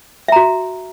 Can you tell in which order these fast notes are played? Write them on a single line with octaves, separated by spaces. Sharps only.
E5 A#5 F#4